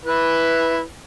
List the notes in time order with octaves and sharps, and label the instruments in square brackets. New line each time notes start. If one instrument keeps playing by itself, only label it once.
[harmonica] E4 B4